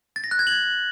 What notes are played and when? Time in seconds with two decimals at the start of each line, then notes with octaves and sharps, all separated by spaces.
0.16 A6
0.24 A#6
0.31 F#6
0.39 G#6
0.47 F#7